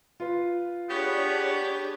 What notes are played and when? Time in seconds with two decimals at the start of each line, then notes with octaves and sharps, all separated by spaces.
0.20 F4 B4
0.90 B3 D4 G4 G#4 C#5